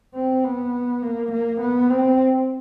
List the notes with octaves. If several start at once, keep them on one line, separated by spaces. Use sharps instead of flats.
C4
B3
A#3
A#3
B3
C4